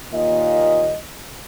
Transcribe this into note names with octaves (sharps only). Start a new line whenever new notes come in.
D#2 A#2 D#5